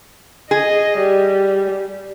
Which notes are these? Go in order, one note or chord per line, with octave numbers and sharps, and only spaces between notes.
G#4 D#5
G3